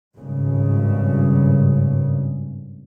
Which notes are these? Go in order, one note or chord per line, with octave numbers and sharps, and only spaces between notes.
G#1 G2 C#3